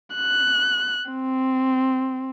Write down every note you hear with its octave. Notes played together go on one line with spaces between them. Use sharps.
F#6
C4